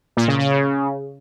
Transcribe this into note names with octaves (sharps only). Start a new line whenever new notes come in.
A#2
C#3
C#3